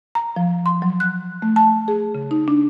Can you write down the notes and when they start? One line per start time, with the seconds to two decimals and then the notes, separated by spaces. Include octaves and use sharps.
0.15 A#5
0.36 F3
0.66 C6
0.82 F#3
1.00 F#6
1.42 A3
1.56 A5
1.88 G#4
2.15 C#3
2.31 D#4
2.48 D4